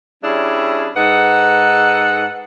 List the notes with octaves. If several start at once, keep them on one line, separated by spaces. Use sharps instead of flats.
G3 C#4 D4 E4 G#4
G#2 D#4 A4 B4 F#5